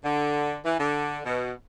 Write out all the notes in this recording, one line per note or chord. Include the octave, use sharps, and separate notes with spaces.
D3
E3
D3
B2